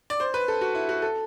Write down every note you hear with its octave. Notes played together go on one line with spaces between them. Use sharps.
D5
C5
B4
A4
F#4
E4
F#4
A4